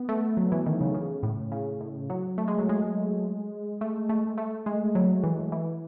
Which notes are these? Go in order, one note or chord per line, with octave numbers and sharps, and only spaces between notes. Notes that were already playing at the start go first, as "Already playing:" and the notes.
Already playing: B3
A3
F#3
E3
D#3
C#3
C#3
A2
C#3
A2
F#3
A3
G#3
F#3
G#3
A3
A3
A3
G#3
F#3
E3
E3